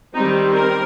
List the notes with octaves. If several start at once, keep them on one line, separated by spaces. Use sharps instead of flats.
D#3 G3 C4 D#4
A#4